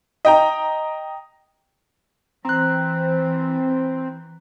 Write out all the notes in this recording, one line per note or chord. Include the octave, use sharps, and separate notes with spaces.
D#5 G5 A#5
E3 C4 A#5 F#6